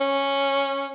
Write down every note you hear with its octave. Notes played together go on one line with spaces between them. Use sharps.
C#4